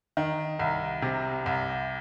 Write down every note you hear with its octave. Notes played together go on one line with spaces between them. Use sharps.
D#3
C2
C3
C2